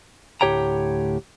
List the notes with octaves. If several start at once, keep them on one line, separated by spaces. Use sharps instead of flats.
D2 A2 G4 C#5 G5 A#5